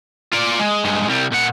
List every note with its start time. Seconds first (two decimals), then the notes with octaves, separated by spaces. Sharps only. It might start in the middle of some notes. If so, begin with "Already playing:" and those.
0.33 F4 D5
0.60 G#3
0.84 G2 G#3
1.07 C2 G3
1.32 A#2 F#5